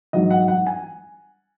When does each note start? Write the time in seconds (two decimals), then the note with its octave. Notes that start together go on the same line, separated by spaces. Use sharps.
0.13 G#2 F#3 D#5
0.30 F#5
0.48 F#5
0.67 G#5